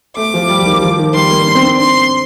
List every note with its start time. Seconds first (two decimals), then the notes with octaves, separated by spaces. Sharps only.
0.17 A3 D6
0.34 F3
0.49 G3
0.59 F3
0.66 D#3
0.82 F3
0.99 D#3
1.14 G3 C6
1.31 A#3
1.47 D4
1.55 C4
1.64 D4
1.80 C6